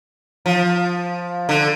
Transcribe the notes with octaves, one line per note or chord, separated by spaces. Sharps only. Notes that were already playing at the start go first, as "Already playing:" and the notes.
F3
D3